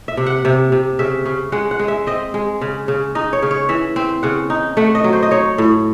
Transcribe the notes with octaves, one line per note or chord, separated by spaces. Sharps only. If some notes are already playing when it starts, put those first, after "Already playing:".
E5
C3
F#5
C3 E5
C3
C#3 E5
C#3
G#3 F#5
F#5
G#3
E5
C4 D#5
G#3
C#3
C#3
D#4 D#5
C#5
C#3
C#5
E3 E5
C4
C#3 F#5
D#4
A3 F#5
D#5
F#3
C5
D#5
D#4 C#5
A2